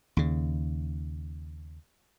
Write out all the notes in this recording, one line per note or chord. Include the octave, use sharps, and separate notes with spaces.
D#2 C#3